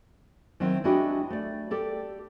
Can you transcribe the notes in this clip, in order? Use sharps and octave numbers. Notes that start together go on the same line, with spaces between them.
D#3 F#3 C4 E4
G#3 D4 E4 F#4 G4 D#5
A3 D5
G4 A4 D5